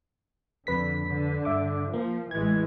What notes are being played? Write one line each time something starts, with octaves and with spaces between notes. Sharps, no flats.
F2 D3 B4 B6
D3
G2 E5 D6
F3 A#3
A1 E3 G#3 G#6